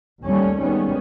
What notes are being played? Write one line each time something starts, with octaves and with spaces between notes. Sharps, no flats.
D#2 G3 A3 C#4
D#3 G3 G#3 B3 C#4